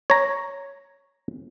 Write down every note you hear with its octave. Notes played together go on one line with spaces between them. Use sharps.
C#5 A#5